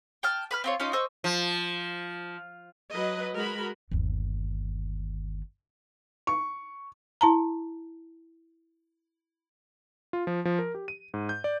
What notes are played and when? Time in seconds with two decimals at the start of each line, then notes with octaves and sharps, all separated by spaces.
0.23 G5 A5 F6
0.51 B4 B5 F6
0.64 C4 F4 C#5
0.80 C#4 D#4 F4 D#5
0.93 C5 D#5 C#6 E6
1.24 F3
2.92 F#3 B4 D#5
3.34 G#3 F#4 A#4 B5
3.92 G1 D#2
6.27 C#6
7.21 E4 A5 A#5
10.13 F4
10.27 F3
10.45 F3
10.59 A#4
10.75 G4
10.88 D#7
11.14 G#2
11.29 G6
11.44 D5